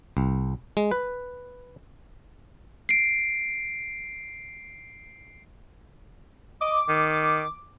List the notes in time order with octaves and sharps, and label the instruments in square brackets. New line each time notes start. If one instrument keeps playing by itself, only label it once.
[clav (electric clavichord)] C2
G#3
B4
[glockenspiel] C7 D7
[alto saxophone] D#5 [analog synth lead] D6
[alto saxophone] D#3